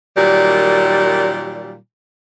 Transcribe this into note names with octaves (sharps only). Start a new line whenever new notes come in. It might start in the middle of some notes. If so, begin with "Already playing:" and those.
A#2 D#3 F#3 G3